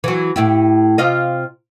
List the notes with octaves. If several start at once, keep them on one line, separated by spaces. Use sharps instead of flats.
E3 F#3
A2 E4 G4
C3 F4 D#5